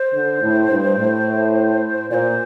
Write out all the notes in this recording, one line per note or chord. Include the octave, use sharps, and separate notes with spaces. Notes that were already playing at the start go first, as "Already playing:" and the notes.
Already playing: C5
D3
A2
G2
A2
A#2 C5 D5